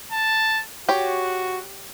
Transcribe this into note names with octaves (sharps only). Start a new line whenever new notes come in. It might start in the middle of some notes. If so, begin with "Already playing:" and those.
A5
F#4 G4 C#5